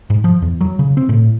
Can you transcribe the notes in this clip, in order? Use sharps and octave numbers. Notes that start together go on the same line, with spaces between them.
G#2
F3
E2
F#3
C#3
C4
A2